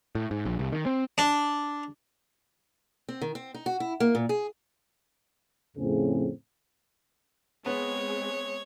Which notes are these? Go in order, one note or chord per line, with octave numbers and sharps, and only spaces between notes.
A2
G#2
A#1
C2
D#3
C4
D4
C4
D#3
C4
D#4
F#4
E4
A#3
A#2
G#4
F2 A2 C#3 F3 C4 G#4
G#3 B3 C4 C#5